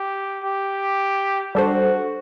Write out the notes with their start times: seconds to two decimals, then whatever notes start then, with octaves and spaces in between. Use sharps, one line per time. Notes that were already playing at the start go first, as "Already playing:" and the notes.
Already playing: G4
0.44 G4
1.55 G3 D4 F#4 A4 C5